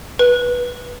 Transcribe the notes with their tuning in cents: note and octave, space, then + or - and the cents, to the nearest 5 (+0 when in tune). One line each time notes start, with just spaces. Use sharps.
B4 -15